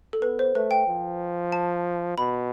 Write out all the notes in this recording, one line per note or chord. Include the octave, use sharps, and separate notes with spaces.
A4
B3 B4
C5
A3 B4
G5
F3
A5
B2 B5